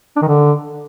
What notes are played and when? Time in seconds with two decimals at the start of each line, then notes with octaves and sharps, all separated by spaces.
0.16 D4
0.22 D#3
0.28 D3